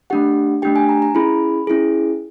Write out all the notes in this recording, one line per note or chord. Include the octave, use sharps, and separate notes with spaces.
A3 D4 G4 F#5
A3 D4 G4 G5
G#5
A#5
A#5
C#4 E4 G#4 B5
C#4 E4 G#4